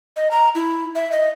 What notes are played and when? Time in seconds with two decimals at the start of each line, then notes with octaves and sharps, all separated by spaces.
0.16 D#5
0.31 A#5
0.55 E4
0.95 E5
1.12 D#5